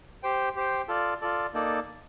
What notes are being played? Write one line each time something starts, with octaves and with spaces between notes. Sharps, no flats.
G4 C5 G5
G4 C5 G5
F4 A4 D5
F4 A4 D5
A#3 D#4 A4 D5